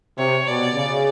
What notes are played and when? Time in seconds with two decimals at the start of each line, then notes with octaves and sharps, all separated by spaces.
0.18 C3 C#5
0.47 B2 D5
0.75 C#3